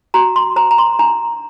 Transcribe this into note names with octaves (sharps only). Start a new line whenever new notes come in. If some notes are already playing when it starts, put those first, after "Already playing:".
F#4 A#5
C6
C5 A#5
A#5
C6
D4 A#5